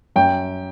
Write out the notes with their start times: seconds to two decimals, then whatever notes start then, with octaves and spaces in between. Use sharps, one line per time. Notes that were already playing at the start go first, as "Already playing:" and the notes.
0.16 F#2 G5